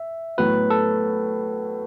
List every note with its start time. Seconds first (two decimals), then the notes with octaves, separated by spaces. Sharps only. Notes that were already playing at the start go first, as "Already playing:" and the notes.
Already playing: E5
0.38 A2 F#3 B3 F#4 B4
0.70 A4